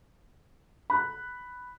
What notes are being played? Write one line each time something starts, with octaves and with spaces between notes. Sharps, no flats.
B5 F#6